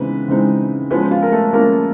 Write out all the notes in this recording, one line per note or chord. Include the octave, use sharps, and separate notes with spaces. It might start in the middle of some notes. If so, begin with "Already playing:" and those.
Already playing: C#3 E3 G#3 B3 C4 D#4 B4
C#3 E3 G#3 C4 D#4
F3 G#3 B3 C#4 B4
F4
A#4
A3 A4
F3 G#3 A#3 C#4 A#4